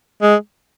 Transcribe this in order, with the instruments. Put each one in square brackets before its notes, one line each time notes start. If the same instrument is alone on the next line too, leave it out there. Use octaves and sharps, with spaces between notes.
[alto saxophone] G#3